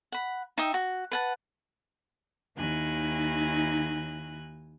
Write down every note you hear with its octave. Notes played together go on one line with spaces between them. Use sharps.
F#5 B5
D#4 E5 G5 D#6
F#4
B4 F#5 A5
D#2 D#3 D#4 E4 G#5 F#6